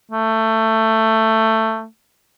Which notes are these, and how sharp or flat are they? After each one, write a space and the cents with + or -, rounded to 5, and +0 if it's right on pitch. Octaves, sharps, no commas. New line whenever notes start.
A3 +15